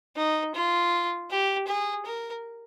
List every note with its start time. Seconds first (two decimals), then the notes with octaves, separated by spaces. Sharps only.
0.17 D#4
0.54 F4
1.30 G4
1.67 G#4
2.06 A#4